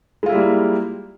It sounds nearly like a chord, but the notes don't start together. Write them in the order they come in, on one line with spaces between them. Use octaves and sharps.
G#3 F4 E4 G3 A#3